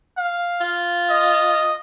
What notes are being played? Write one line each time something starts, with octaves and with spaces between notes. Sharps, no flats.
F5
F4
D#5